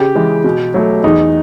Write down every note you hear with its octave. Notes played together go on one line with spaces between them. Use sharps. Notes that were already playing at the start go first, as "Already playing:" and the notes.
Already playing: C#3 G4
E3 G#3
B2
F#3 A3
E2 D#4